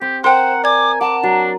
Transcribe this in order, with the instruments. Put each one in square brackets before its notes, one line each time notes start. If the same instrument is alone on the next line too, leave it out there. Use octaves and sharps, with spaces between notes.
[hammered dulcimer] C4 [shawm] G4
[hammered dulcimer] A#4 [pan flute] C5 [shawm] F#5 [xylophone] G5 C6
[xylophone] D5 G#6 [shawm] G#5 [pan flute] D6
[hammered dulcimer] F#5 [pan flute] A5 [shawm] D6
[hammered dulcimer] F#3 [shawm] D4